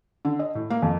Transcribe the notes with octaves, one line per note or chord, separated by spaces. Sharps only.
D3
D#5
A2
A#3
F2